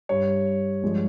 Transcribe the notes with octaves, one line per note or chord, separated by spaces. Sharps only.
G2 G3 C#5
G2 F3 G#3